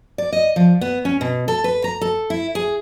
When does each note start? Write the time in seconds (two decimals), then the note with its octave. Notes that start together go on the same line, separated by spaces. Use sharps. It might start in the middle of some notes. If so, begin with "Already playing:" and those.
0.18 D5
0.32 D#5
0.56 F3
0.81 B3
1.05 C#4
1.21 B2
1.48 A4
1.64 B4
1.84 A#5
2.01 A4
2.30 E4
2.55 G#4